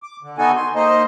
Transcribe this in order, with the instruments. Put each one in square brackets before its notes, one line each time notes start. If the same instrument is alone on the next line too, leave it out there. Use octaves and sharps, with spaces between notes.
[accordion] D6
D3
B3 D#4 F#4 A4 G#5
C6
A#3 D#4 C5 D#5